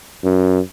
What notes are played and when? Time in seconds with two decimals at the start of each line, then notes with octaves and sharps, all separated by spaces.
0.24 F#2